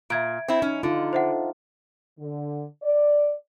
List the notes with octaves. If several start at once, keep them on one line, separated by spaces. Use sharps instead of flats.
A#2 E5 G#6 D7
C4 E4
C#4 D#4
D3 D#4 F4
C5 E5 F#5
D3
D5